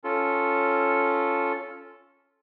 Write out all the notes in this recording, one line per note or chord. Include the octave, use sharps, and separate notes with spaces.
C#4 F4 A4